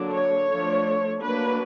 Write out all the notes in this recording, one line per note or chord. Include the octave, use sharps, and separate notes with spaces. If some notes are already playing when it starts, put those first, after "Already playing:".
Already playing: D3 F#3 A#3 D4
C#5
F3 A3 D4
F#3 A#3 D4 B4